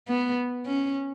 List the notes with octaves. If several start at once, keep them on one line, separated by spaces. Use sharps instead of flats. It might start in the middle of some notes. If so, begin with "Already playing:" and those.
B3
C#4